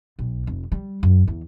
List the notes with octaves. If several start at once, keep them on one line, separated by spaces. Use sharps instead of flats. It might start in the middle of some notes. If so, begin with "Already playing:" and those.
B1
F1
G3
F#2
E2